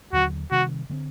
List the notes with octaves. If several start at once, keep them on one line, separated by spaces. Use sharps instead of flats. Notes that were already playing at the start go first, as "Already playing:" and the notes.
D#2 D3 F#3 F#4
C3 D#3 G3 F#4
D3 G3 C4